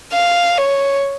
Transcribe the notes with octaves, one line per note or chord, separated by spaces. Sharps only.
F5
C#5